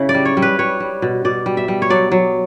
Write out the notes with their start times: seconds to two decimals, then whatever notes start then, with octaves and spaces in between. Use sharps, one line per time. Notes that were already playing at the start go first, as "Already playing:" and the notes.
Already playing: C#3 E4
0.09 D5
0.14 G3
0.25 C#5
0.37 G3
0.42 B4
0.59 G3 C#5
0.80 G3
1.02 B2
1.25 B2 D5
1.46 G3
1.57 E5
1.68 G3
1.82 C#5
1.90 F#3 D5
2.12 F#3